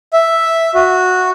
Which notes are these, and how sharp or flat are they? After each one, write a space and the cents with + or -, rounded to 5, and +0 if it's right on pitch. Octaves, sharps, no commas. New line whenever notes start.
E5 +0
F#4 -10